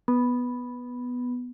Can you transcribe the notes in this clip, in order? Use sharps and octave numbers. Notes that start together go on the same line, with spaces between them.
B3